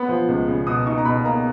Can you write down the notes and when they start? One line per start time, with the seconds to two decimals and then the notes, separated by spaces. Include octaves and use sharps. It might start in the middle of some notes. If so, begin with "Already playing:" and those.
Already playing: B3 B5
0.09 F3
0.28 C#2
0.48 C#3
0.67 B2 D#6
0.86 D#4 C#6
0.98 A#5
1.05 B2 B5
1.24 A#3 A#5